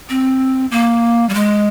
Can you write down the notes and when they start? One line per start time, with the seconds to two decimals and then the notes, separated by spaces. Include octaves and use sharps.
0.09 C4
0.71 A#3
1.29 G3
1.34 G#3